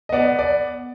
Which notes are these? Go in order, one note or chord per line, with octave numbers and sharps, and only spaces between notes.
D#5
B3 D5
D5